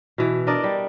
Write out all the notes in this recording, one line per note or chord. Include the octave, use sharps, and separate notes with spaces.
B2 E3
D4 A#4 D5 D#5
G3